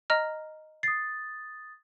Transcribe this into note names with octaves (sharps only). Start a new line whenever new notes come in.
D#5 A#5 F6
D#6 A6 C7